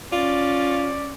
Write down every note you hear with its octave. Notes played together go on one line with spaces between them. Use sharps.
C#4 F4 D5